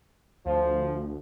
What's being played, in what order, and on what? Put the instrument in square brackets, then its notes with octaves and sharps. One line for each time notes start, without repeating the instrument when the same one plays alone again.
[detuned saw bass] D2 [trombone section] F3